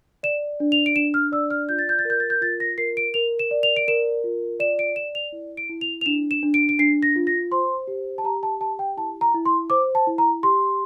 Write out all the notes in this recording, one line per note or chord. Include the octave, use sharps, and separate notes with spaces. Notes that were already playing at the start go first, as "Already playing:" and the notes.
D5 E7
D4
F7
D7
D4 E7
F6
D5 E6
F6
F4 G6
A6
G6
A6
A#4 G6
A6
G6
F4 A6
A#6
A#4 C7
D7
A#4 F7
E7
D5
F7
D7
A#4 E7
F4
D5 E7
D7
D5 E7
F7
E4
D7
E4
F7
F7
D4 E7
E7
D4
D7
D7
D4 C7
A#6
F4
A#6
C5 C6
G4
A5
G4 A#5
A5
G4 A5
G5
E4 A5
A#5
E4
C6
C5 D6
A5
E4
A#5
G4 C6